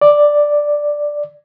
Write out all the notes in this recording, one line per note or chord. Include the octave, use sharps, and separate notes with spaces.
D5